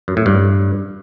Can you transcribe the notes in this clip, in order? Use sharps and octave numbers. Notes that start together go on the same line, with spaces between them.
F#2
A2
G2